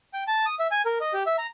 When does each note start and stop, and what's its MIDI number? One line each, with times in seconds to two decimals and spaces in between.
0.13 0.24 79
0.27 0.45 81
0.46 0.55 87
0.59 0.67 76
0.71 0.82 80
0.86 0.98 70
1.01 1.13 75
1.13 1.23 67
1.27 1.36 76
1.38 1.47 82